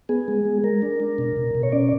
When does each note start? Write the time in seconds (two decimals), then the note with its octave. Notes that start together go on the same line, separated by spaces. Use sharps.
0.09 B3 G#4
0.28 G#3
0.45 G#3
0.64 G#3 A#4
0.82 D4
1.00 D4
1.18 B2
1.36 B2
1.55 B2
1.63 C#5
1.72 C#4 D5